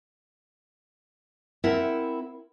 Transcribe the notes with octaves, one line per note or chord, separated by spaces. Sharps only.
C4 E4 A#4 E5 F#5